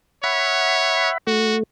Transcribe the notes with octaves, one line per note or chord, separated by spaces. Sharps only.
C#5 E5 F#5 B5
A3 F#4